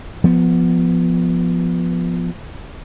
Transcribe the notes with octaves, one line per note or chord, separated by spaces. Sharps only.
F3 B3